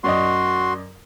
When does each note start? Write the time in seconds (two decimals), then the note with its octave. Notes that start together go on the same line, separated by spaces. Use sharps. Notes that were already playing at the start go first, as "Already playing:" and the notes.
0.04 F#2 F#4 D5 D#5 C6